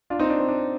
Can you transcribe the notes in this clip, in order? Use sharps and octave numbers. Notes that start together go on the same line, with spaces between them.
D4 F4
C4 D#4
D4
C4
D4